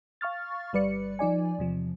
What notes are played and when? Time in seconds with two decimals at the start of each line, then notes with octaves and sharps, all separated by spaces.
0.21 F5 C#6 F6 A6
0.73 G1 G3 B4 D5 C#7
1.19 F3 D#4 D5 G#5
1.59 E2 C3 F3